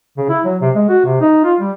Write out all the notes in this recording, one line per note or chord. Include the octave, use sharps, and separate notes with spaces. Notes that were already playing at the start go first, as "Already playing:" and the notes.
C#3
E4
F#3
C3
G#3
F#4
C3
D#4
F4
G3